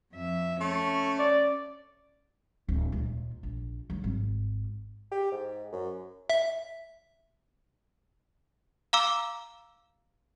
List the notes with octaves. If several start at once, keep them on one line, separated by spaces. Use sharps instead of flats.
F2 E5
A3 C#4
D5
D1
D#2 A#2
A#1
D#3 F#3
G#1
G4
G#2
F#2
E5
F5 A#5 D6 E6